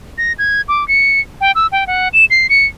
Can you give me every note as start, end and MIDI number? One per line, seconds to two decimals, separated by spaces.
0.18 0.33 94
0.39 0.61 92
0.68 0.86 86
0.88 1.20 97
1.41 1.52 79
1.55 1.67 88
1.72 1.84 79
1.87 2.08 78
2.13 2.25 100
2.30 2.47 96
2.49 2.66 97